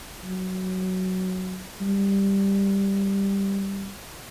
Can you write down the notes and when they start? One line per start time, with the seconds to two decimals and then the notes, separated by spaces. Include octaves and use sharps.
0.24 F#3
1.81 G3